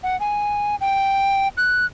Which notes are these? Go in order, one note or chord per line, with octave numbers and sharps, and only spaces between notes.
F#5
G#5
G5
F#6